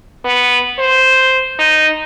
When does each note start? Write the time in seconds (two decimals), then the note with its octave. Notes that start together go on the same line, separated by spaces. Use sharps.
0.25 B3
0.79 C5
1.59 D#4